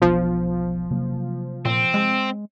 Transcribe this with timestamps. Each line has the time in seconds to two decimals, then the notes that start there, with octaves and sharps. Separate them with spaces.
0.02 E1 B1 F3 B3 D4
0.90 C3 F#3 A#3
1.65 A#2 C4
1.94 G#3